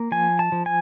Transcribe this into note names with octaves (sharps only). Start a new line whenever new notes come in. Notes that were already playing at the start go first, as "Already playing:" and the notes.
Already playing: A#3
F3 G#5
A5
F3
G#5